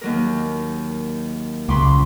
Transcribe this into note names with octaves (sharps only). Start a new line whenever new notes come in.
D#2 F#3 A#4
C#2 B5 C6 D6